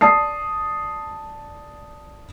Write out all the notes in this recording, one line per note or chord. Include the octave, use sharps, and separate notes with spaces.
D5 A5 D#6 C7